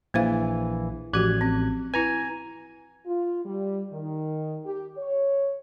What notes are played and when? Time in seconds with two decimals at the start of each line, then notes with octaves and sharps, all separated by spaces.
0.14 A#1 E3 A#3 C5 F5
1.13 A1 F3 F#4 G4 F#6 G#6
1.41 C4
1.94 E4 B4 G#5 A#5
3.06 F4
3.45 G3
3.91 D#3
4.65 G4
4.97 C#5